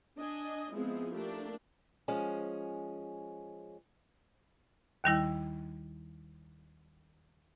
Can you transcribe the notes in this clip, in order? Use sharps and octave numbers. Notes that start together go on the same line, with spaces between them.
D4 D#5 G#5
F3 G#3 B3 C4 E4 G#4
A3 A#3 D4 G4
F3 G#3 C#4
D#2 D#3 G3 E4